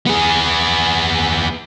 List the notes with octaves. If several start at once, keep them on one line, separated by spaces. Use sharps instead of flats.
B3 G#4